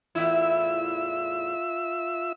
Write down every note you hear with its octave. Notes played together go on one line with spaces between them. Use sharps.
E2 A2 E4 F4 E5 E6